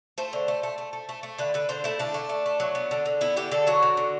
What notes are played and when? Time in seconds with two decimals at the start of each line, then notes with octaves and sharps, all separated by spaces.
0.18 A3 C5
0.33 D3
0.48 A3
0.63 A3
0.78 A3
0.93 A3
1.09 A3
1.23 A3
1.38 D3 B4
1.54 D3 B4
1.69 D3 C5
1.84 A3 E4
1.99 D3 D4
2.14 A3
2.29 A3
2.46 A3
2.60 F#3
2.75 B3
2.91 D3
3.06 D3
3.21 B3 E4
3.36 D3 G4
3.51 D3 A4
3.67 F#3 F#4
3.83 D3
3.97 D3